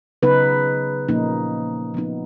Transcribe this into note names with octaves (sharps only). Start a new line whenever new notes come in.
C#3 F#3 B3 D#4 B4
A#2 F3 A#3 C#4 D#4
F3 B3 D#4